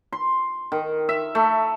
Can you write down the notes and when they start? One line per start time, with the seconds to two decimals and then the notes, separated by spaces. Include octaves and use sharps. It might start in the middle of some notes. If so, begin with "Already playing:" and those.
0.13 C6
0.72 D#3
1.09 E5
1.35 A3